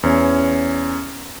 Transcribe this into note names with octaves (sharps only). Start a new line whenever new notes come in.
E2 C#4 C#5